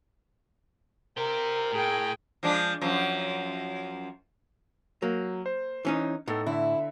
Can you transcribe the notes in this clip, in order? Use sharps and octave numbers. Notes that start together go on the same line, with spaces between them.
G4 A#4 C5
A2 G#4 G5
F3 G#3 D4
F#2 F3
F#3 A#3
C5
E3 C#4 D#4
A2 B3 D#4 A4
D3 E4 E5